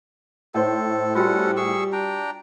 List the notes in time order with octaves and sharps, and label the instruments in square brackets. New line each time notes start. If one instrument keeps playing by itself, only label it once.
[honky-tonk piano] A2 C5 [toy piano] D#4 C#5 [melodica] A4
[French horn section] G3 [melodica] C#4 A4 F#5 [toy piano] F4 F#4 A#4
[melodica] G#4 C#6 E6
D4 G5 A#5